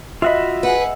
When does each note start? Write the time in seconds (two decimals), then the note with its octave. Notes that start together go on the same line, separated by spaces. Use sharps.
0.22 F4 F#4 D#5 E5 B5
0.63 G#4 B4 F#5